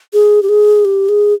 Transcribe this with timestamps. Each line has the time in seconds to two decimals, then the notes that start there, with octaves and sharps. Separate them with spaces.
0.13 G#4
0.43 G4
0.49 G#4
0.85 G4
1.09 G#4